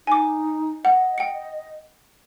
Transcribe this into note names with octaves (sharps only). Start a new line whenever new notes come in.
D#4 G#5 D6
D#5 F#5
G5 C#7